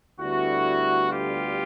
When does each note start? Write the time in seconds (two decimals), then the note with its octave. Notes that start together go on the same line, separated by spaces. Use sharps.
0.19 D2 D3 G3 B3 E4 F#4
1.12 F4 G4